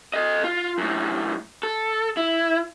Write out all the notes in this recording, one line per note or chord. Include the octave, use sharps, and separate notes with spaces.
A4 D#5
F4
F#2 A2
A4
E4